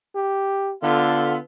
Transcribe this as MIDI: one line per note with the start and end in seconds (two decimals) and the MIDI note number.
0.15 0.73 67
0.83 1.38 50
0.83 1.37 59
0.83 1.37 65
0.83 1.37 69